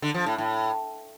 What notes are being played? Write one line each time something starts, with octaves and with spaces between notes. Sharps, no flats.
D3
F3
A2
A2